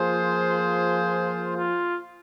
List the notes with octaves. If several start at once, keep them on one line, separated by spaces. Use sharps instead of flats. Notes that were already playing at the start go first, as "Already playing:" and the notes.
Already playing: F3 A#3 F4 G#4 C5
F4